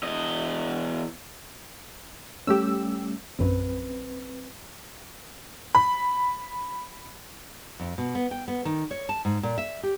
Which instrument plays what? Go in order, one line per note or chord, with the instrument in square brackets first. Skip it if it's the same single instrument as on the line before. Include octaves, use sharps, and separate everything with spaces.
[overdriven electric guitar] E2 D#5
[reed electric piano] G3 A3 C#4 [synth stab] G4 E6
[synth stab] A#1 F#2 [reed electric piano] C4 B4
[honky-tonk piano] B5
[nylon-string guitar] F2
B2
B3
G5
B3
D#3
C#5
A5
G#2
A#2
E5
G4